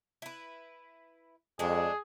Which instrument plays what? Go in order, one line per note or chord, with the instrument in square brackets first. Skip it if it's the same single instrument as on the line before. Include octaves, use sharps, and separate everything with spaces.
[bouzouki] E4 B4
[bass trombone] F2 [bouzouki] G#3 A3 D4 [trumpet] G#4